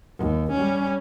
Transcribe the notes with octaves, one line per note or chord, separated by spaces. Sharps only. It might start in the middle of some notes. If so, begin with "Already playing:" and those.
D#2
G3 C#4